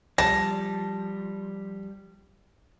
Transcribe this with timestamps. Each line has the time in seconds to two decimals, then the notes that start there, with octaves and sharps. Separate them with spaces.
0.18 F3 G3 A5 A#6